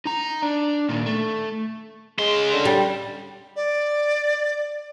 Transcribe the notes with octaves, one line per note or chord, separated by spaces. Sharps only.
D#4 A#5
D4
A#2 D#3
A3
C#3 G#3 C6
D3
G3
D5